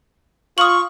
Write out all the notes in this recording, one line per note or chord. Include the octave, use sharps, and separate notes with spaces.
F4 C#6 D#6 F#7